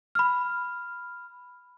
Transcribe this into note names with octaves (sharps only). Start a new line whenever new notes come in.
B5 F6